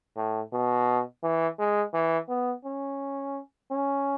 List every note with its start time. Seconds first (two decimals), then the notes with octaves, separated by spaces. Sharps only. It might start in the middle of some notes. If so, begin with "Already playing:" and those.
0.16 A2
0.53 B2
1.23 E3
1.59 G#3
1.94 E3
2.29 B3
2.65 C#4
3.71 C#4